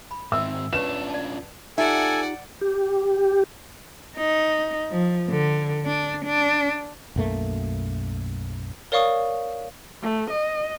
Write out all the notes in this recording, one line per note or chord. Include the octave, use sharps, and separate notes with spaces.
B5
G#2 D#3 C4 E5 E6
C#4 D4 F4 B4 C#5 C#6 E7
D5 A5
D#4 F4 G4 A4 D5 E5 F#5 G#5
G4
D#4
F3
D3
D4
D4
B1 F#2 A3 A#3
A#4 C#5 D5 F5 C#6 D#6
A3
D#5